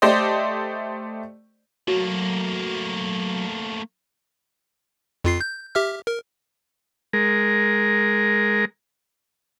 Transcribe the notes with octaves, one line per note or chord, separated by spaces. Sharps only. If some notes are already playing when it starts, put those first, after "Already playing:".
A3 G4 C5 D5 D#5
F#3 A3 A#3 F#4
F2 F4 C7
G6
G4 E5 F6
A#4
G#3 A#4